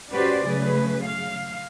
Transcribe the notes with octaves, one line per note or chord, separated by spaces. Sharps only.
C#4 F#4 G4 B4 C5 D5
C#3 F#3 A3 G#4 B4
F5